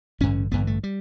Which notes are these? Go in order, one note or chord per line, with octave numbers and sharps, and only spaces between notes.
A1 G2 D3 C#4
A1 G2 D3 B3
A3
G3